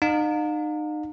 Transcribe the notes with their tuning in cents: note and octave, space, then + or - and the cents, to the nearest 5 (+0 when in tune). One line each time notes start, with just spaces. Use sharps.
D#4 -35 F5 +40